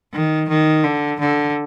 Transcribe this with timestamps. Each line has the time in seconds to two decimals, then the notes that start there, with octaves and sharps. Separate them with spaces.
0.13 D#3
0.49 D#3
0.84 D3
1.20 D3